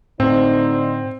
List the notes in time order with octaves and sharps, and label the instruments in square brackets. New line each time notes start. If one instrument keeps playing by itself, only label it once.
[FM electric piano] A2 [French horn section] D3 D#4 C5 [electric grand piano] C4